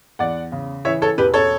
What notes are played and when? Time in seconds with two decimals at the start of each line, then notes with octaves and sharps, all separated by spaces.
0.19 E2 D5 F#5
0.52 C#3
0.85 E3 C#5 E5
1.02 A4 C#5
1.18 E1 G4 B4
1.34 A4 C#5